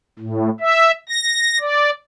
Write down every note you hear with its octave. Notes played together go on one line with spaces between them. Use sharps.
A2
E5
A#6
D5